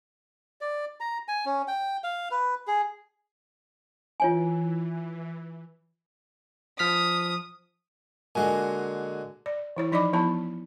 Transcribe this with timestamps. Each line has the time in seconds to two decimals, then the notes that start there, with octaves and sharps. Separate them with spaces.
0.61 D5
1.00 A#5
1.28 G#5
1.46 C#4
1.68 G5
2.04 F5
2.31 B4
2.67 G#4
4.20 E3 F4 C#5 G#5
6.79 F3 D#6 F6 B6
8.35 A#2 D3 G#3 F#4 G#5
9.46 D5
9.76 E3 E4 C#5
9.92 F3 D#4 D5 D#5 B5 D6
10.13 F3 B3 E4 A5 B5